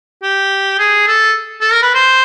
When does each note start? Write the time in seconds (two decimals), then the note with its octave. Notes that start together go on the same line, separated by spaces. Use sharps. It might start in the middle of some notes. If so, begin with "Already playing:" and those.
0.23 G4
0.79 G#4
1.08 A4
1.61 A4
1.72 A#4
1.82 B4
1.94 C5